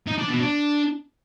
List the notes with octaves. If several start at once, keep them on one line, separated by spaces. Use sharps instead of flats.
D#4
D4
B2
D4